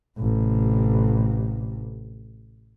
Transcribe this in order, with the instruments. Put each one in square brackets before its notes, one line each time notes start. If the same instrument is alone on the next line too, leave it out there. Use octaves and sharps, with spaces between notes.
[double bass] A1 C3